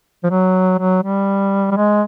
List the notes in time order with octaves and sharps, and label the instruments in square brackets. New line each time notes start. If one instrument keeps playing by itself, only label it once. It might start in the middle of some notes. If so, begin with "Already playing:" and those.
[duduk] F3
F#3
F#3
G3
G3
G#3